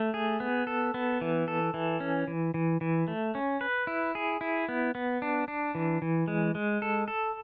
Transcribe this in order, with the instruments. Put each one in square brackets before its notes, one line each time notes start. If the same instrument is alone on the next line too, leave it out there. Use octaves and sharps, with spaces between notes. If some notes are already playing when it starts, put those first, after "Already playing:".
Already playing: [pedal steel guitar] A3
G#4
B3
A4
B3
E3
A4
E3
C#4
E3
E3
E3
A3
C#4
B4
E4
G#4
E4
B3
B3
D4
D4
E3
E3
G#3
G#3
A4
A4